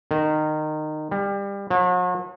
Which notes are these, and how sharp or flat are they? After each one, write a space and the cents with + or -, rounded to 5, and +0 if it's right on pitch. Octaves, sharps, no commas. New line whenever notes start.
D#3 -20
G3 +25
F#3 -45